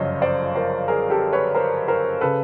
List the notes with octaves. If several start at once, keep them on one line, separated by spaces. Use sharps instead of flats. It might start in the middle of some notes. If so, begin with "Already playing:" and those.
Already playing: G1 F#2 C#3 F3 C5 C#5 D#5
C5 D5
A#4 C5
G#4 A#4
G4 A4
B4 C#5
A#4 C5
A#4 C5
C#3 A4 B4